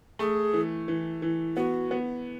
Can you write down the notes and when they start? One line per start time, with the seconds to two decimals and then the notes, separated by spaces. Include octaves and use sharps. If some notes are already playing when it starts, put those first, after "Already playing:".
0.19 A3 G#4
0.53 E3
0.88 E3
1.22 E3
1.56 B3 F#4
1.91 B3